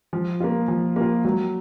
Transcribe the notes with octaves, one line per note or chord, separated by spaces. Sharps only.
F3
A#3 F4
F3
A#3 F4
F#3